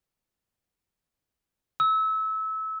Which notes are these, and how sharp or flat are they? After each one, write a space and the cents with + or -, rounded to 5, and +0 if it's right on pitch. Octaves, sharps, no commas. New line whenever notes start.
E6 -25